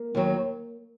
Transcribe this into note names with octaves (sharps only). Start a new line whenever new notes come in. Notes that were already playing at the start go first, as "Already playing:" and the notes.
Already playing: A#3
D#2 D#3 F#3